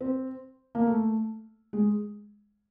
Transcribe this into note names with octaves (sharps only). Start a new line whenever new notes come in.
C4
A#3
A3
G#3